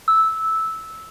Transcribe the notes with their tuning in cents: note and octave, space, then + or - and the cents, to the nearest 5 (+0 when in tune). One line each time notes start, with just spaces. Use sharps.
E6 -10